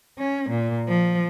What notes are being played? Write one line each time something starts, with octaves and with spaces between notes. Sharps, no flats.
C#4
A#2
F3